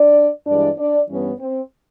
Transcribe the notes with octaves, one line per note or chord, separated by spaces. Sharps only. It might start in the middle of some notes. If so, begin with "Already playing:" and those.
Already playing: D4 D5
G2 E3 G#3 D4 D5
D4 D5
G2 E3 G3 B3 C#4 D4 C#5
C4 C5